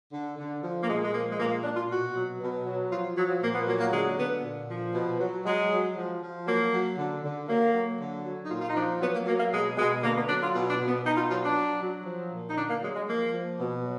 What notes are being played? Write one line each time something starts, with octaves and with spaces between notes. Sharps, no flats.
D3
D3
F3
A#3
A#2 G#3
G#3
F3 A#3
G#3
A#2 A#3
G#3
A#3
A#2 D4
F4
B2 F#4
F#3
B2
F#3
F3 F4
F3 F#3
F#3
A#2 A#3
B3
F#3 A#3
A#3
D3 G#3
D3 B3
A#2
F3
B2
F#3
F#3 G#3
F#3
F3
F3
F#3 A#3
F#3
D3
D3
F#3 A#3
F#3
D3
F#3
D#4
A#2 F4
F4
D#4
F3 D4
F#3 B3
A#3
F#3 A#3
A#3
B2 G#3
B2 G#3
D3 A#3
B3
F#3 D4
F4
B2 F4
D4
B2
B3
B2 D#4
F4
F#3 F4
D4
F#3
F#3
F3
A#2
D#4
D3 D4
A#3
F#3 G#3
G#3
F3 A#3
F3
B2
F#3